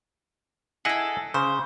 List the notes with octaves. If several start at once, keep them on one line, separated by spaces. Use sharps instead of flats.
E4 G#4 A4 D#5 F#5
C#3 C5